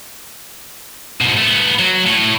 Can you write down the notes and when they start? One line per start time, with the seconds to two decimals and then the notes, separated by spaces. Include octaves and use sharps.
1.21 G#2 B2
1.37 A3 B3
1.79 F#3
2.06 A2